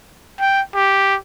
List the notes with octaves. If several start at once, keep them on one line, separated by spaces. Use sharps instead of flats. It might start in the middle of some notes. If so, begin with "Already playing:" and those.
G5
G4